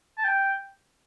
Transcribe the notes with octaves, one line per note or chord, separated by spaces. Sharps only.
A5
G5